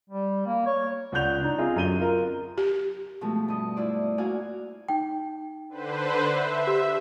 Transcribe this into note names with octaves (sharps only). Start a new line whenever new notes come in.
G3
A#3
C#5
C#2 D5 F#5 F#6 G6 F7
D4 D#4
C4 F4 G#4 D#5
F#2 D3 D#7 G7
F4 A#4
G4
B2 F3 G#3 A3 C4
G2 D#5
E4 F4 C5 D5
A#3 F#4 D5 F5 F#5 G#5
D#4 G5
D3 B4 C5
E5
G4